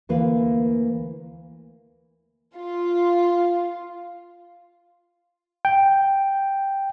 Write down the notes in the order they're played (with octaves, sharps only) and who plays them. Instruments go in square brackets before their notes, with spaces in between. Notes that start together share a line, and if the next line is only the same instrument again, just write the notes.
[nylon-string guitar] D2 E3 A#3 B4 F5
[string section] F4
[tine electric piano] G5